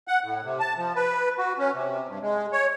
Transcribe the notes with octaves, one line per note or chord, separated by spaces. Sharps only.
F#5
A2
C3
A5
F3
B4
F#4
C#4
C3
G2
G#3
C#5